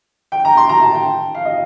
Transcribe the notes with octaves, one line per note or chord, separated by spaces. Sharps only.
G5
A#5
C6
A#5
A5
G5
F5
D#5